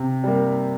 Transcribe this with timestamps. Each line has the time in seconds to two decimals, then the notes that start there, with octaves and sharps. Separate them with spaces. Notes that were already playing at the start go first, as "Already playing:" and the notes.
Already playing: C3
0.23 G3 A#3